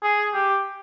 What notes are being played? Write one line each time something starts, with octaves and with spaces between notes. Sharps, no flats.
G#4
G4